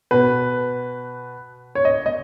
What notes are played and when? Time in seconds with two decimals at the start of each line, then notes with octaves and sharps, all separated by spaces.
0.11 B2 B4
1.75 C#5
1.85 D#5
2.06 D#5